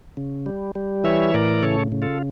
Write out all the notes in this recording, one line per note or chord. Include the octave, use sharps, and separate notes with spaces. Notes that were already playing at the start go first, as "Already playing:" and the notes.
C#3
G3
G3
E3 C#5 E5
A2 A#4 D5
C#3 A4 C#5
C#3
F4 A4